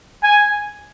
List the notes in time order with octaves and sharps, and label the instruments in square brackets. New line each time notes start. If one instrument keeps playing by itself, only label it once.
[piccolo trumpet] G#5